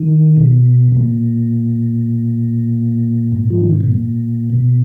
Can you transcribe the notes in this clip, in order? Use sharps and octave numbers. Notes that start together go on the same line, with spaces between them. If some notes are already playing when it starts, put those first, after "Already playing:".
Already playing: D#3
B2
B2
A#2
G#2
F3
D#3
C#3
B2
A#2
B2